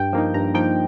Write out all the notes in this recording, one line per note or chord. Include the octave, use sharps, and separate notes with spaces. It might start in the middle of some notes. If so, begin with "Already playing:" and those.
Already playing: G2 G5
F3 A#3 D#4
G2 A#5
F3 A#3 D#4 G5